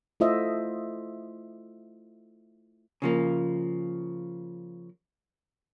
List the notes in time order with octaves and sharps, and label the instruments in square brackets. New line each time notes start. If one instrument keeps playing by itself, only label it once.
[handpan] A3 E4 F4 C5 D#5 E5
[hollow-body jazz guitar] C#3 F3 A#3